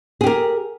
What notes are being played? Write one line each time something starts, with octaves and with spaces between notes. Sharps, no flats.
G4 G#4 A#4